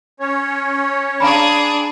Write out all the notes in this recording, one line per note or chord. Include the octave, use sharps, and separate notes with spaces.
C#4 C#5
D4 G#4 F5 A#5 B5